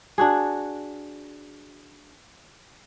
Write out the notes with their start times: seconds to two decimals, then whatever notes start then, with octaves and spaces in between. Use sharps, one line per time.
0.18 D4 F#4 G#4